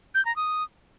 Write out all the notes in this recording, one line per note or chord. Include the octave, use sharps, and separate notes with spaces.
G6
A#5
D#6